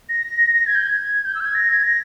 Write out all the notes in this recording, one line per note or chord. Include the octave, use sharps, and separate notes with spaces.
A#6
G#6
G6
G#6
G6
E6
G6
G#6
A#6
G#6
A#6